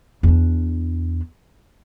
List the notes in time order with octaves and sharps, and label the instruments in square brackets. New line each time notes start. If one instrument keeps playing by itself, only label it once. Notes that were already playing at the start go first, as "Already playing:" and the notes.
[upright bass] E2 D4